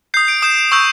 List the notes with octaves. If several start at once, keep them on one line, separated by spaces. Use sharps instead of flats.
D#6 G6 C7
D7
D#6 G6 E7
C#6 E6 G6